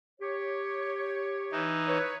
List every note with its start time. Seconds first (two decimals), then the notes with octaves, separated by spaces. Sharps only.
0.20 G4 C#5
1.52 E3 D#4
1.88 B4 C#5